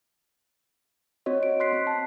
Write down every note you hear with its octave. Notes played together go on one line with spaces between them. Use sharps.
C4 F#4 C#5 D#5
D7
C6 F#6 B6 C7
C4
A5